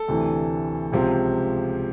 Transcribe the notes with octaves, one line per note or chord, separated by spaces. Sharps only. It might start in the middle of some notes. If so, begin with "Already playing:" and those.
Already playing: A4
D2 C3 E3
C#2 C3 F3